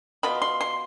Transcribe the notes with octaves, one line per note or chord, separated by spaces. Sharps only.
B2 B3 F4 B5
C6
C6